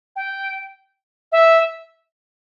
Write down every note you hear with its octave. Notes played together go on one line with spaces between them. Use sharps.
G5
E5